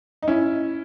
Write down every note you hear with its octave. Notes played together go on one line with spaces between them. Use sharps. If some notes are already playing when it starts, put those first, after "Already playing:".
D#4
C#4 E4